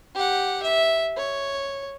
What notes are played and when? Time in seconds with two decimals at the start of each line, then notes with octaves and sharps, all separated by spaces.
0.15 G4 F#5
0.63 E5
1.17 C#5